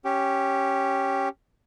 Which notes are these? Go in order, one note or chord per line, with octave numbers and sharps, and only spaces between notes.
C#4 G4